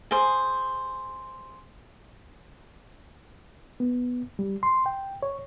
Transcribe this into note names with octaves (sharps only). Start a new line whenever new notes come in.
G#4 C5
B3
G3
C6
G5
C#5